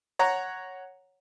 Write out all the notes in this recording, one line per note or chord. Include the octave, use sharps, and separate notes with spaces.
C#5 F#5 A#5